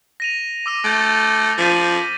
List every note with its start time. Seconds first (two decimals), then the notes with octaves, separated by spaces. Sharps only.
0.20 A#6 D#7 F7
0.66 D6 E6 D#7
0.84 A3 D6 G6 A6
1.58 F3 A6 B6 D#7